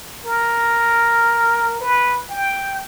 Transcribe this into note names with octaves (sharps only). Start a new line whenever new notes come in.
A#4
B4
G5